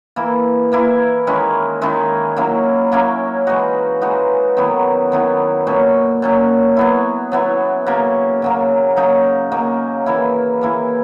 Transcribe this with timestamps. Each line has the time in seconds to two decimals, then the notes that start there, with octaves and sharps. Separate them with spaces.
0.16 E3 A#3 E4
0.72 E3 A#3 E4
1.27 D#3 G#3 C#4 E4
1.82 D#3 G#3 C#4 E4
2.36 F#3 A#3 C#4 E4
2.92 F#3 A#3 C#4 E4
3.47 E3 G#3 D#4 F#4
4.01 E3 G#3 D#4 F#4
4.57 D#3 F#3 B3 E4
5.12 D#3 F#3 B3 E4
5.67 A#2 F#3 C#4
6.22 A#2 F#3 C#4
6.77 F#3 B3 E4
7.32 F#3 B3 E4
7.87 C#3 F#3 A#3
8.42 C#3 F#3 A#3
8.97 C#3 F#3 A#3 D#4
9.51 C#3 F#3 A#3 D#4
10.06 E3 A#3 E4
10.61 E3 A#3 E4